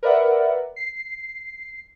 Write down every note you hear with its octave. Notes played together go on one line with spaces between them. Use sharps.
A#4 B4 D5 E5 F#5
C7